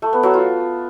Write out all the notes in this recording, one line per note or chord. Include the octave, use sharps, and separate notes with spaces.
A3
B3
F#3
F4